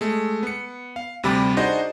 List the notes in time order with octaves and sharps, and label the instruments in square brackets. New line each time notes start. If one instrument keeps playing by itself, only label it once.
[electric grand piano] G#3 A3
B3 C#7
F5
D2 C3 G3 B5 D6 A6
D4 D#4 F#4 G#4 C5 D#5